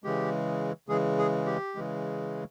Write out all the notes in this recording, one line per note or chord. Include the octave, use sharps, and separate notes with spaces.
C#3 E3 G#3 G4
C#3 E3 G#3 G#4
G#4
G4
C#3 E3 G#3